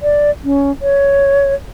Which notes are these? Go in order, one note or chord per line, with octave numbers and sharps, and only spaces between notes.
D5
C#4
C#5